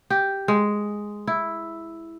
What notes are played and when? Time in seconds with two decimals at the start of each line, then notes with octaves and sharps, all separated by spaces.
0.10 G4
0.48 G#3
1.27 E4